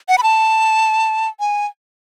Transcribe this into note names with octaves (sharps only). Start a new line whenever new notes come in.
F#5
B5
A5
G#5